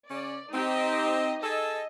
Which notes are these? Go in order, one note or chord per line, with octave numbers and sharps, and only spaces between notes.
C#3 C#4 D5
C4 D#4 G4 D#5
G#4 A4 D#5